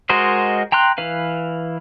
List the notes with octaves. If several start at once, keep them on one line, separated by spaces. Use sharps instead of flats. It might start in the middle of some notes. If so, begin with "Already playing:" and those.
G#3 F#4 A#4 C5 D#5
G5 A#5 C6 F#6
E3 B4 F5